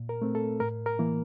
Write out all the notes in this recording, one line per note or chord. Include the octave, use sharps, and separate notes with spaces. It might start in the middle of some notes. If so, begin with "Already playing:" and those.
Already playing: A#2
A#4
A3 C4
A4
A2 A#4
A#4
E3 A#3